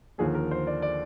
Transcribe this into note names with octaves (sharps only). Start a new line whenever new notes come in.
D#2 D3 F3 A#3 G#4
A#4
C5
D5
D5